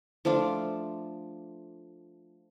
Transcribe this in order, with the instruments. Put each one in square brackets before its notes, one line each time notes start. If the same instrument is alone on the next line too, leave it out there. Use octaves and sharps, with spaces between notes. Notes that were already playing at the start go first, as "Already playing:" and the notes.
[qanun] F3 A3 D4 F4